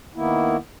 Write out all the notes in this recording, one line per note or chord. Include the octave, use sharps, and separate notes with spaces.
D#3 A#3 B3 E4